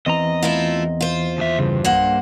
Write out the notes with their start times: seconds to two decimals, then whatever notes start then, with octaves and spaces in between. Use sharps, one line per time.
0.06 E2 E3 C4 D#5 A#5
0.42 A3 E4 F4
1.01 F4 C5
1.38 D#2 E5
1.59 G2 C#3
1.85 B1 A#3 C5 F#5